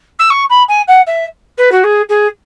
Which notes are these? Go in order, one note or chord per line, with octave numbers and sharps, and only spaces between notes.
E6
C#6
B5
G#5
F#5
E5
B4
F#4
G#4
G#4